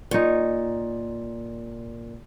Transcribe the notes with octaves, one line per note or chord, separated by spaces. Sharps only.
A#2 D#4 C#5